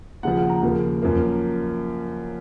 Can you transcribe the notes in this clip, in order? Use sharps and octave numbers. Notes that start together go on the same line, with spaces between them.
D#2 C#3 F3 F#5
F#5
A#5
D#2 C#3 F3 A#3
F#2 F3 A#3